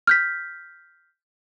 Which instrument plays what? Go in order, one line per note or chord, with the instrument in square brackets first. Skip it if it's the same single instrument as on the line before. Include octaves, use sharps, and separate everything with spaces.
[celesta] F6 G6 B6